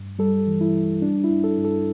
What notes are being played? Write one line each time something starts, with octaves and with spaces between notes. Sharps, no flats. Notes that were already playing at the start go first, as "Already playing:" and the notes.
Already playing: G2
G3 A4
E3
E4
C2
G3 D4
E4
G2
A4
G2
A4